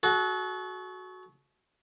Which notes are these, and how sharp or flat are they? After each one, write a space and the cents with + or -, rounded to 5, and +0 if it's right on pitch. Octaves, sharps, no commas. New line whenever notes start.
F#4 +0 A4 -45